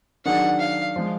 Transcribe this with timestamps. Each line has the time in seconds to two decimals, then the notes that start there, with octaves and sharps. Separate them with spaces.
0.25 D#3 F#3 D4 G#4 F#5
0.60 F5
0.96 F3 G#3